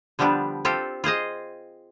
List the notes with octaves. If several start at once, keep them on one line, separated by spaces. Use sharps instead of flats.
D3 F3 G3 B3 D4
C4 F4 G4 A4
F4 G#4 C5 D#5